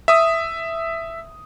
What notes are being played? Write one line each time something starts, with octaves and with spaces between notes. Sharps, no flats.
E5 D#6